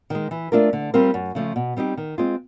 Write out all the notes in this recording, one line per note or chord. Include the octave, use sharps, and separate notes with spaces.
D#3 G#3
E3
A3 D4 F4 A#4
D3
G3 C4 F4 A#4
F#2
C#3 F3 A3
B2
G3 C4 D#4 G4
D#3
G#3 C4 F4